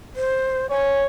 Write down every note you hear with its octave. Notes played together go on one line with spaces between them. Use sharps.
C5
C#5 G#5